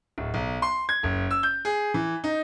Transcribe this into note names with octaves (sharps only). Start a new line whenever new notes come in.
D1
B1
C6
G#6
F#1
E6
G6
G#4
E3
D#4